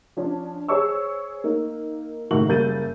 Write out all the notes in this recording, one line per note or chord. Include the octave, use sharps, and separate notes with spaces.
F3 C#4 D4
G#4 C5 C#5 C#6 E6
A#3 D#4
F#1 A2 D#3 F#4 C#6 F#7
F#1 G3 A#3 G6 A6 D#7